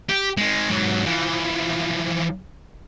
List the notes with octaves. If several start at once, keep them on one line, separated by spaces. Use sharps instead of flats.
G4
D#3 G#3
G#2 F#3
E3 F3